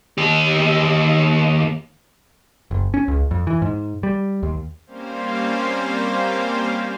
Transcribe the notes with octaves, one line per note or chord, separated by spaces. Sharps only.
D#2 G4
F#1
C#4
C#2
F2
E3
G#2
G3
D#2
G3 A#3 C4 C#4 C5 F5